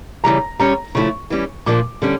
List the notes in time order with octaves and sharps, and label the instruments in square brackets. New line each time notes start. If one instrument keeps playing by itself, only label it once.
[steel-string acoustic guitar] C#3 E3 G3 [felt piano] A#5
[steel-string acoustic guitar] G3 C#4 G4 C#5 [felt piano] A#5
[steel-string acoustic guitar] C#3 F3 A3 E4 [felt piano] C#6
[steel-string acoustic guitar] E3 G3 C#4
[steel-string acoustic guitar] A#2 F3 A#3 D4 [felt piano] D6
[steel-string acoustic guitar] D3 G3 C#4